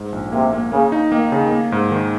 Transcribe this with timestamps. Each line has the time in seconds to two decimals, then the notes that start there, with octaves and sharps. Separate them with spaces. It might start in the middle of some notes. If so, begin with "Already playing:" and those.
Already playing: G#2
0.13 A#1
0.32 C3 A#3
0.53 A#3
0.72 C#3 A#3
0.92 D#4
1.12 D#3 A#3
1.32 C#3
1.52 A#3
1.72 G#2
1.91 D#3